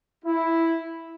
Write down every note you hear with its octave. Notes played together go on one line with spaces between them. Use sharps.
E4